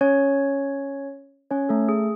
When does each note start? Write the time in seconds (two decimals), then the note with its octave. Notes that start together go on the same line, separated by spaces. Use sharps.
0.01 C#4 C#5
1.51 C#4 C#5
1.69 A3 A4
1.89 G#4